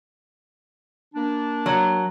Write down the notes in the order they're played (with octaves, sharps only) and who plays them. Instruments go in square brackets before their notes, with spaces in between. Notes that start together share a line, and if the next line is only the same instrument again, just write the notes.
[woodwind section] A#3 D4
[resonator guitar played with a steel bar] F#3